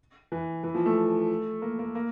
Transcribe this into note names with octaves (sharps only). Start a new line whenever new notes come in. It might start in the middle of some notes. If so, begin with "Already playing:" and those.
E3
E3
F3
A3
A#3
A#3
A#3